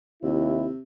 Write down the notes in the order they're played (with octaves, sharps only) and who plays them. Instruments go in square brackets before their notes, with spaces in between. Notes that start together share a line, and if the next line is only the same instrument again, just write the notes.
[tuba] D#2 [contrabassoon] C3 [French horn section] E4